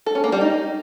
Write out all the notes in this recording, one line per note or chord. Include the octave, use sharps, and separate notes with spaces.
A4
C#4
A#3
G3
D#4